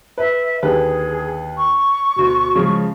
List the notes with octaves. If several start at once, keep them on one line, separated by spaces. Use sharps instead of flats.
B4 E5
D#2 D3 G#4 B4
C#6
D2 B2
C#3 F3 G#3